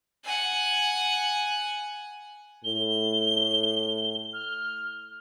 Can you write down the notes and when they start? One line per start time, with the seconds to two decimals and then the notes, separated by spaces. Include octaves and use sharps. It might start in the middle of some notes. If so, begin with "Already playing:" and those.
0.24 F#5 G#5
2.64 A2 G7
4.33 F6